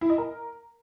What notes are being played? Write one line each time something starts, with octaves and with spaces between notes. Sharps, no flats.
E4
D#5
A#4